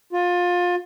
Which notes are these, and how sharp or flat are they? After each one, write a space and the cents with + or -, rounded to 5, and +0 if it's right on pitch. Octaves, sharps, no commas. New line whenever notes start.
F4 +25